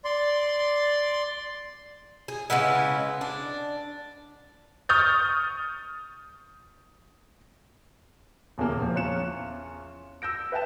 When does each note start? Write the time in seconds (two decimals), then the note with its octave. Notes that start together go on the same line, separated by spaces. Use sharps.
0.05 D5 C6
2.28 G#4
2.50 C#3 G#3 B3 E4
3.21 D4
4.89 C#6 D#6 F6 G6 A6
8.58 D#1 E2 C#3 A#3 A#4
8.79 E2 A#2 F3
8.94 E2 C#4 F4 F#6 C#7 E7
10.22 E6 G6 A#6 D7
10.52 B4 E5 G5 A5 E7